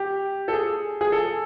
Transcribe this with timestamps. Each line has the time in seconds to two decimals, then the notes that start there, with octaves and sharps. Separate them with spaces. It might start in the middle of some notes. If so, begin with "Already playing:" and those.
Already playing: G4
0.48 A4
0.53 G#4
1.01 G#4
1.12 A4